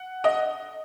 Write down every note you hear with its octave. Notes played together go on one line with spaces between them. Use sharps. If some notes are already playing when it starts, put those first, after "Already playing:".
Already playing: F#5
D#5